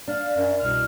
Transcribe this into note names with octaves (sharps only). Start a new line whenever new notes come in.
D4 F5
F#2
C2 B2 F6